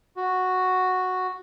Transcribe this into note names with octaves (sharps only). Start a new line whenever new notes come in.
F#4